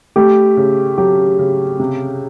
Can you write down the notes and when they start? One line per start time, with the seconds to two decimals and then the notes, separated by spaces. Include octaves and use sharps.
0.16 A3 G4
0.57 C#3
0.98 F#3 G4
1.39 C#3
1.80 C3